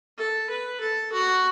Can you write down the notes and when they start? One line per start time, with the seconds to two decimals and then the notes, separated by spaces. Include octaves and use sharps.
0.18 A4
0.50 B4
0.81 A4
1.13 F#4